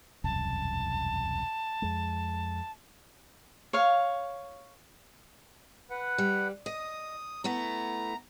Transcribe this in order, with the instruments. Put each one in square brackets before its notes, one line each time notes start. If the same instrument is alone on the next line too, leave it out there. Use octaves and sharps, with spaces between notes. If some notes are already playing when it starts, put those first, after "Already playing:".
[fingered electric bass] E1 C2 F#2 [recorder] A5
[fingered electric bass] F2 G#3
[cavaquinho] C#5 F5
[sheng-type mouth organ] B4 F#5
[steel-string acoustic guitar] G3
[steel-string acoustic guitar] D#5 [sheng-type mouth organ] D#6
[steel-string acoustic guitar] A3 B3 E4 [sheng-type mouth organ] A#5